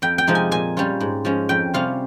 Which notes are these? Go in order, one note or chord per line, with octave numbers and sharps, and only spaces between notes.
F2 G5
G5
C3 F3 G#3 D#4
G#5
A#2 G#5
G3 C#4 F4
G#2
F3 G#3 C#4
F2 G5
C3 G3 C#4 F4 F5